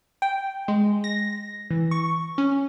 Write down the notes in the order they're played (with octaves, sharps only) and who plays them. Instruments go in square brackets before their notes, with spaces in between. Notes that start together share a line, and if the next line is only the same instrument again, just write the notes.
[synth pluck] G5
G#3
A#6
E3
C#6
C#4